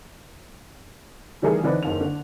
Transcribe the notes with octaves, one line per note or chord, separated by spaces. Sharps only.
D#3 E3 G3 A3 G#4 A#4
D3 E3 C4 D4 D#4 B4
F#1 D#2 F7
D3